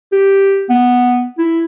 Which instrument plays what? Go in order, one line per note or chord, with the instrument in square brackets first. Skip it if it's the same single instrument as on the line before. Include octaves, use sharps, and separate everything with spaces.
[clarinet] G4
B3
E4